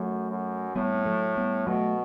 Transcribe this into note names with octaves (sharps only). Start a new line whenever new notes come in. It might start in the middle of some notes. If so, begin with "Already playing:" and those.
Already playing: F#2 F#3 A3
F#2
A2 G3 B3
B3
F#3 A3
G3 B3
B2 F#3 A3